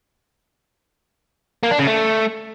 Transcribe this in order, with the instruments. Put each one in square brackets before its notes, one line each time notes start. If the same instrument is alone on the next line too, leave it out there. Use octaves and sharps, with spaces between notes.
[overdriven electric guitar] A#3
D4
C#3
A3